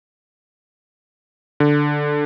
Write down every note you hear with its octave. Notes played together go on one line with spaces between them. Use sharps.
D3